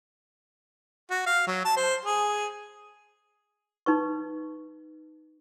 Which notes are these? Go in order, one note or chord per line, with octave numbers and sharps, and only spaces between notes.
F#4
F5
F#3
A5
C5
G#4
D#4 B4 C#6